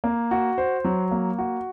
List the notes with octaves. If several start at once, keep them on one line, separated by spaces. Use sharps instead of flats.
A#3
F#4
C5
F#3
A#3
F#4